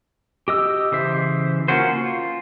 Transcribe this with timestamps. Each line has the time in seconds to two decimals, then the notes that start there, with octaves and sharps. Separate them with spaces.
0.48 G4 D#5 E6
0.92 C#3 E3 C5 E5
1.68 A#3 C#4 F4 F#4 C5
1.93 F4